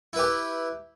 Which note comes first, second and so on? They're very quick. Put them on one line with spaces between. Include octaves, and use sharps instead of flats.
E4 B4 G4